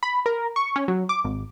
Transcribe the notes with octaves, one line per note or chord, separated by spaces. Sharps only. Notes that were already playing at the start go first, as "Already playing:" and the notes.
B5
A#4
C#6
C#4
F#3
D6
G#1